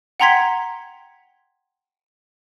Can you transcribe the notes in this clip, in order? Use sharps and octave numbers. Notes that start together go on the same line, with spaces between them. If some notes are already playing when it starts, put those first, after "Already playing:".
F#5 G5 A#5 C6 G#6 B6